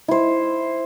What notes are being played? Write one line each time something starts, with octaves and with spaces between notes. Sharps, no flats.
E4 C5